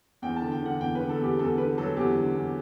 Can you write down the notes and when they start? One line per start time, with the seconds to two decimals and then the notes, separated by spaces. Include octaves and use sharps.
0.22 E2 G5
0.36 A5
0.42 D3
0.52 G5
0.62 D3 F#5
0.80 E2 G5
0.95 B4
1.00 D3
1.09 A4
1.19 E2 G4
1.39 E2 A4
1.58 D3 B4
1.78 F#3 A4
1.96 E2 G4
2.15 D3
2.35 E2